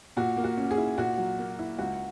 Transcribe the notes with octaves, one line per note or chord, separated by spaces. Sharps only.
A#2 F#4
A#3
F#4
C#4
G#4
E4
A#2 F#4
F#3
A#3
E4
C#2 F#4